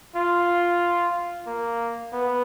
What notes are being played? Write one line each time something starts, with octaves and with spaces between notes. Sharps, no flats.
F4
A#3
B3